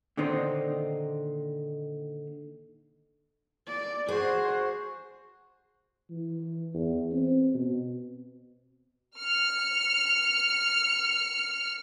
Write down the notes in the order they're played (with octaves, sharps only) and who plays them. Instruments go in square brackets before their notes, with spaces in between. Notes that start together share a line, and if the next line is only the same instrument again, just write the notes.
[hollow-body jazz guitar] A#2 D3 D#3 C4 D#4
[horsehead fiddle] D5
[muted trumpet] F#4 [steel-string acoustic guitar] G#4 [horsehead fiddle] C5
[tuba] E3
E2
C4
B2
[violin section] F6 C#7